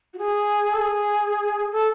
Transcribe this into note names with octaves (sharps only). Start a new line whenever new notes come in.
F#4
G#4
A4
G#4
A4